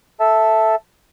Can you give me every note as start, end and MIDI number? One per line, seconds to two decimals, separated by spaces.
0.20 0.75 69
0.20 0.75 76
0.20 0.75 81